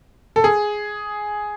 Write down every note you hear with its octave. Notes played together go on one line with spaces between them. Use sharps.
A4
G#4